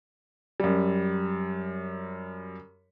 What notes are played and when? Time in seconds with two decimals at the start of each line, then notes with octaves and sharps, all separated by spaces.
0.60 F#2 G3